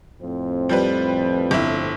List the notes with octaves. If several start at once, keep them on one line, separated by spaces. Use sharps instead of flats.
F2 A2 C4
F3 G3 B4
G1 E4